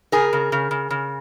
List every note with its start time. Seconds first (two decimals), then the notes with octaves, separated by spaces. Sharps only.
0.12 C#3 G#4 A#4
0.33 C#3
0.52 C#3
0.71 C#3
0.90 C#3